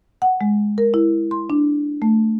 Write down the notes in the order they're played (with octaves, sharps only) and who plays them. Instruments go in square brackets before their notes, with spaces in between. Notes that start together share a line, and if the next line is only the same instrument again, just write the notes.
[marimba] F#5
G#3
A#4
E4
C6
D4
A3